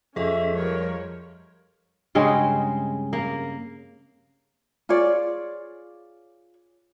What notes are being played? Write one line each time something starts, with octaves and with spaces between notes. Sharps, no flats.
F2 C#4 G#4 A4 D#5 E5
F3 G3 A#4 C#5
G2 C#3 G#3 C4
A#3
F4 G#4 C#5 D5